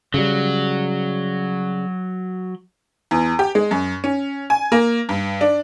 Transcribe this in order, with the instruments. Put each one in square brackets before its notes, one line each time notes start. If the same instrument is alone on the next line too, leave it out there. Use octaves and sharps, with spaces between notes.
[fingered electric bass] C#3 G3 [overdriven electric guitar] F#3
[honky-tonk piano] E2
G4
G#3
F#2
C#4
G#5
A#3
G2
D4